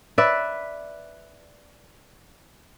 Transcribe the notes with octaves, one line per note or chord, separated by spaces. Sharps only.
B4 D5 E5